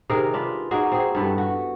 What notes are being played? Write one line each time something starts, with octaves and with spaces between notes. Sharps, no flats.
C3 D#3 G#4 A#4
D4 F4 B4
A#3 D#4 F#4 G#4
C4 G#4
G2 B3 E4 A4
F#4